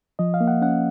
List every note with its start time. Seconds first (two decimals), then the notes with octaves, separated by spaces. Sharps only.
0.19 F3 D#5
0.34 F5
0.41 A#3
0.48 F#5
0.62 C#4 F#5